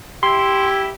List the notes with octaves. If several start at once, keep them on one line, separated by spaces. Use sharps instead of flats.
E4 G4 C6